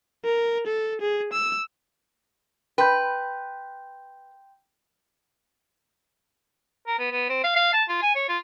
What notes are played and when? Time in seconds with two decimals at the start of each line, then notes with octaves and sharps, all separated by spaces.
0.24 A#4
0.66 A4
1.01 G#4
1.32 E6
2.78 B4 G5 C6 G6
6.87 A#4
6.99 B3
7.11 B3
7.29 C4
7.44 F5
7.56 F5
7.73 A5
7.89 F4
8.02 G#5
8.15 C#5
8.29 F4